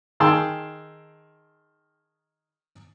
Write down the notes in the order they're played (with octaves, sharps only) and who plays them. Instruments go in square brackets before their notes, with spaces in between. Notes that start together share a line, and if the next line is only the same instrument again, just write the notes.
[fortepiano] D#3 G#4 G5 A5 C6 E6